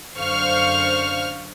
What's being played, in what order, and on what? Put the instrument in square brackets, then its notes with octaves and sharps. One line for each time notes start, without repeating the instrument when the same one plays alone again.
[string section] F#2 D3 C5 F5 C#6 F6